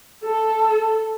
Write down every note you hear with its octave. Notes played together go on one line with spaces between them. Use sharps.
A4